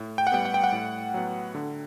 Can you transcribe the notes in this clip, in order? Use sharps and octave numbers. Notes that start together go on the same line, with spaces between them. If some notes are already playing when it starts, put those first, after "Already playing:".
Already playing: A2
G5
F#5
G3 B3 G5
F#5
G5
F#5
A2
F#3 B3
D3